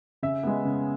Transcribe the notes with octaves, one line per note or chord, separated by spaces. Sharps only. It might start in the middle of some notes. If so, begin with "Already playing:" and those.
C#3 E5
G#3 B3
C#3